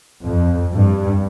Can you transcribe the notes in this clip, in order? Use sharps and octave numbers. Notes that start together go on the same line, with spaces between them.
F2
G2